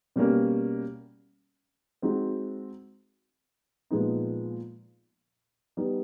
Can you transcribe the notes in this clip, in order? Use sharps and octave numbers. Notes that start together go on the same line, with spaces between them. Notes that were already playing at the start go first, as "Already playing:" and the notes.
B2 G3 A#3 C#4
G#3 C4 D#4 F#4
A#2 F3 G#3 B3 D#4
G3 B3 D#4